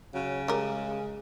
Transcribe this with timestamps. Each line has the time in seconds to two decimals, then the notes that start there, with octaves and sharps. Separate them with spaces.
0.14 C#3 F#3
0.48 G3 G#3 A#4